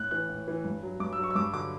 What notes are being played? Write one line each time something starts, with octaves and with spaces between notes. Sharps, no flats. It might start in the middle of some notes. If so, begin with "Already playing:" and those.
Already playing: A2 F#6
E3 F#6
A2
E3
G2
F#3
G2 D6
E6
F#3
C#6
E6
G2 D6
D3 F#3 D6